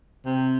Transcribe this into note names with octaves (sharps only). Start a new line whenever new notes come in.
C3